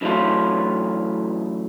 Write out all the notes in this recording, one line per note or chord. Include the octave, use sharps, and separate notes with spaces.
F#2 E3 F#3 G#3 A3 F4